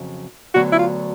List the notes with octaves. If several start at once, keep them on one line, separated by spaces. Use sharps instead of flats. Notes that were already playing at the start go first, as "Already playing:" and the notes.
Already playing: F2 C#3 F#3
D2 D3 F#3 B3 F#4
E4
F4